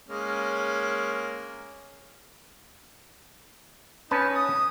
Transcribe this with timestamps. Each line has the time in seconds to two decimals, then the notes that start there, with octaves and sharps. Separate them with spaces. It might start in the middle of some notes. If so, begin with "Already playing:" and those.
0.08 G#3 A#3 C#4
4.11 C#4 D#4 B4 A5
4.35 D#6